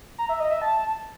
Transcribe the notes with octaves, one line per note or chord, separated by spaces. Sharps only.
A#5
E5
D#5
E5
A5